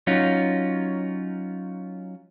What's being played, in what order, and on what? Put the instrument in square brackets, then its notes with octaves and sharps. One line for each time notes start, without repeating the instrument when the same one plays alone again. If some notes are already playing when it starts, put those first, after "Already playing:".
[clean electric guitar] F#3 C#4 D#4 F4